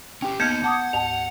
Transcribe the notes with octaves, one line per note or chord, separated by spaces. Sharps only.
C#4 G4 G5
A#3 B3 D#4 D#5 F6 G6 G#6 C#7
F#5 A5 D6 D#6
D2 G#2 A5 F7